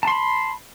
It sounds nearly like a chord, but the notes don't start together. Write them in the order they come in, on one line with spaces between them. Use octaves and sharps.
A5 C6 B5